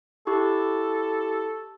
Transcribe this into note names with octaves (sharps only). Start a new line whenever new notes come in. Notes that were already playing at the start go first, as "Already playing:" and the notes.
E4 G4 A4 C#6